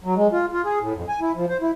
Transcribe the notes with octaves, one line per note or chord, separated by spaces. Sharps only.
F#3
G#3
F4
F4
G#4
A2
F2
G#5
E4
F3
C5
E4